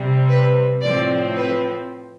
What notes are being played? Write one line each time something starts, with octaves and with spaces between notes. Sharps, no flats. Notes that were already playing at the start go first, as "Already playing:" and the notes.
Already playing: C3 G3 C4
B4
A2 F3 C4 D5
B4